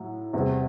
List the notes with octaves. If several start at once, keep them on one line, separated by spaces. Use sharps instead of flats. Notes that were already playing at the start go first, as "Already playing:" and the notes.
Already playing: A2 F#3
E2 C3 G3